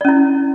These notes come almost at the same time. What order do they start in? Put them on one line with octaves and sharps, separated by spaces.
D5 C#4 E4